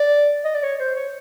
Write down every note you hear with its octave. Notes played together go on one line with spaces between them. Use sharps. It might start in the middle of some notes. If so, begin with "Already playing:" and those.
Already playing: D5
D#5
D5
C#5
C5
C#5